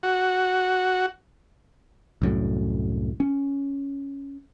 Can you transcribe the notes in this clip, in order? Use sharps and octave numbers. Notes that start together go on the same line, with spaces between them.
F#4
C2 F#2 A2
C#4